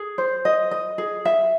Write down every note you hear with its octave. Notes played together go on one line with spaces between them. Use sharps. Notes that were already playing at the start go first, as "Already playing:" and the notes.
Already playing: G#4
C5
D#5
D#5
G#4
E5